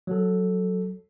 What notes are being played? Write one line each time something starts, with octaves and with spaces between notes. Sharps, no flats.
F#3 A4